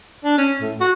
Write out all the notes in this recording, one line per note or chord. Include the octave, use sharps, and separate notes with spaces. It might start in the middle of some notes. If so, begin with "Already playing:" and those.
D4
C#4
A2
F#4